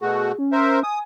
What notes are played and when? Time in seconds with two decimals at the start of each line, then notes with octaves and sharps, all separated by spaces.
0.01 B2 A3 F#4 G#4
0.39 C#4
0.52 A#4 C5 E5
0.83 G#5 D#6